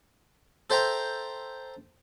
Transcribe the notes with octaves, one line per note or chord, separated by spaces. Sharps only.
A4 C5 E5 G5 A#5